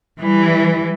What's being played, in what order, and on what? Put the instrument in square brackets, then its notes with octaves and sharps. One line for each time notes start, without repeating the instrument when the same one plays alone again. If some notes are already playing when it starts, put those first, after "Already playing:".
[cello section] E3 G3